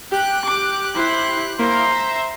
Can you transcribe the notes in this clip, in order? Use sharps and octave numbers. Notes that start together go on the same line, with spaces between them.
G4 G5 F#6
D6
E4 C5
A#3 E4 A#4 C5 A#5
E5